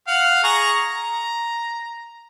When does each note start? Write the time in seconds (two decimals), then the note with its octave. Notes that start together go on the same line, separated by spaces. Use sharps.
0.07 F5 F#5
0.44 G#4 A#5 C#6
0.89 A#5